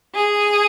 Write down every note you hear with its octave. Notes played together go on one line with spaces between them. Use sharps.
G#4